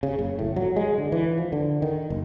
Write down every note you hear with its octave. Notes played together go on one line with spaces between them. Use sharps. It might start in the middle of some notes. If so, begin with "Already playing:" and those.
C#3
F#1
A2
F#3
G#3
D3
E3
F3
D3
D#3
F#1